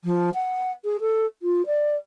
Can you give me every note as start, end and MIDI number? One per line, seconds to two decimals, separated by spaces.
0.04 0.29 53
0.34 0.71 78
0.84 0.97 68
1.00 1.25 69
1.42 1.65 65
1.66 1.95 74